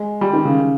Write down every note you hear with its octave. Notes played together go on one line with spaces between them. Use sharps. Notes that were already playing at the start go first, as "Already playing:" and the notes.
Already playing: G#3
G3
D#3
C#3